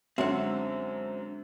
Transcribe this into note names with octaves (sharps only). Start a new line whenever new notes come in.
F#2 D3 F#3 G#3 C4 E5 F#5